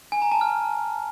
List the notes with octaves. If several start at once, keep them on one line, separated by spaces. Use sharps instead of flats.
G#5
A#5
A5
F6